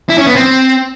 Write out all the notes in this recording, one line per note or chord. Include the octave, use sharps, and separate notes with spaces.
E4
C#4
B3
C4